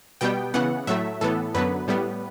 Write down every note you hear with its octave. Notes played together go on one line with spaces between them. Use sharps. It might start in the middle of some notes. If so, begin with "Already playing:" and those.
B2 G3 B3 G5
C#3 E3 B3 F#5
A2 F#3 A3 E5
A2 E3 B3 A4
F#2 D3 F#3 B3 B4
A2 G3 B3